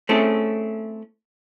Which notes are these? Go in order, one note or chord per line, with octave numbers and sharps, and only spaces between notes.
A3 C4 C#4 E4 G#4 A4